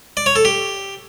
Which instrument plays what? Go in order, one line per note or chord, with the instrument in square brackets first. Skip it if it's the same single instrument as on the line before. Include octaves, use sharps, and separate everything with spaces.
[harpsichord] D5
C#5
A4
G4